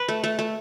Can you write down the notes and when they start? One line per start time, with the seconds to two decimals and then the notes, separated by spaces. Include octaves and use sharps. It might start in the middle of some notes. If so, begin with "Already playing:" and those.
Already playing: B4
0.09 A3
0.24 A3
0.39 A3